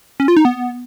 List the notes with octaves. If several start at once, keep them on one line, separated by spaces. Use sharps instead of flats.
C#4
F4
D#4
B3